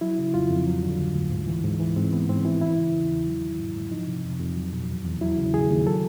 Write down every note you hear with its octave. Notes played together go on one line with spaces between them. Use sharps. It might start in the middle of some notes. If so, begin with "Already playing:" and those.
F#3 E4
C#3
F2 F4
F2
F#3
D3
D2
D2
G#2
E3
G#2
E3
G#2 C4
E3 B3
G#2 C4
E3 E4
E3 E4
C#3
E2
E2
F#3
D#3
G#2
G#2
F3 D#4
C3
F2
F2
F#3
B2
E2
E2
F#3 E4
C#3
D#2 G#4
D#2
F#3 A4